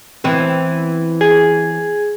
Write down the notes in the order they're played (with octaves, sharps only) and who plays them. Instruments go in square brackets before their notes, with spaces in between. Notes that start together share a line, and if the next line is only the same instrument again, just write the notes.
[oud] E3 B3 C4
[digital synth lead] G#4